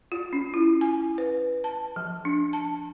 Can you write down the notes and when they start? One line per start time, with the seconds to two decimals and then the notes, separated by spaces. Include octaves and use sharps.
0.12 F4
0.33 C#4
0.54 E4
0.81 G#5
1.18 B4
1.64 A5
1.96 F3
2.25 D4
2.53 A5